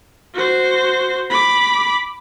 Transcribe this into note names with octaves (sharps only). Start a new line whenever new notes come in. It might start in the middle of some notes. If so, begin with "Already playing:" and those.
F#4 C5
B5 D6